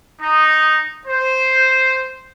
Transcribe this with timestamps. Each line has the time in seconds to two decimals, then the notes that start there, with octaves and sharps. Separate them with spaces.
0.21 D#4
1.07 C5